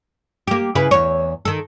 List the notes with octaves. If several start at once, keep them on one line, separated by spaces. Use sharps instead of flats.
A#3 G4
C#3 E4 B4
E2 C#5
D#3 A4